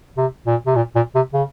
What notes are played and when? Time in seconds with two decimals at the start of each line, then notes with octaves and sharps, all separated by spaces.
0.17 C3
0.47 A#2
0.66 C3
0.76 A#2
0.95 A#2
1.15 C3
1.33 C#3